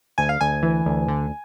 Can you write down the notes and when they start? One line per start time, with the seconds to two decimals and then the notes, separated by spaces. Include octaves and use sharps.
0.18 D2 G#5
0.29 F5
0.41 D2 G#5
0.63 E3
0.86 D2
1.08 D3